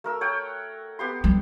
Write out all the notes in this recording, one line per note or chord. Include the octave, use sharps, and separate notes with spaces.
A3 A#4 E6
C#5 F#5 G5
B3 G4 C6
G3 C4